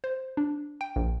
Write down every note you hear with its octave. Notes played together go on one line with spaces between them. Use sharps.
C5
D4
G5
A#1